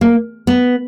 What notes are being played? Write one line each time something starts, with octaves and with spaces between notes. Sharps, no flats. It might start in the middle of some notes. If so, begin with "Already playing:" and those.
A#3
B3